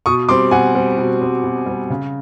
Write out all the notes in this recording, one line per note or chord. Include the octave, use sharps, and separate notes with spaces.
B2 C#6 D#6
G3 C4 C6 D6
B2 F#5 G#5
G3 C4
B2
G3 C4
B2
G3 C4
C#3